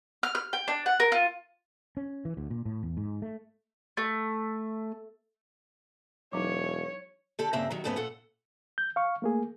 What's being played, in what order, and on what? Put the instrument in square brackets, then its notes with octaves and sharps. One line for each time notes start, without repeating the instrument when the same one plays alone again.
[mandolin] F6
F6
G5
D4
F#5
A#4
F4
[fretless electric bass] C#4
E3
D2
A#2
A2
E2
G#2
A3
[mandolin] A3
[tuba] E1 [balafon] F#3 D#4 [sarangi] C#5
[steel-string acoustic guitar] D3 G4 A4
G2 C#3 A#3 C4 E5
D#3 F#3
F2 G#2 C#3 A3 B3 C#4
A#2 A4 F#5
[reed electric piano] G6
F5 C#6
A3 A#3 G#4